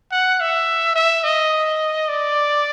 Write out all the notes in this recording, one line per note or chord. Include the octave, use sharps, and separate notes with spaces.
F#5
E5
E5
D#5
D5